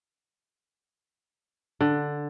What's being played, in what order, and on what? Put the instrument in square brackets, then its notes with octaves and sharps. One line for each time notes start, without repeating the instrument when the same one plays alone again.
[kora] D3